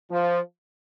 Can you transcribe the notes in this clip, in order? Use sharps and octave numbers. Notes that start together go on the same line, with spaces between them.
F3